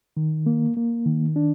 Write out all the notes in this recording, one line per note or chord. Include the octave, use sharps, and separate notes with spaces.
D#3
A#3
A#3
D#3
D4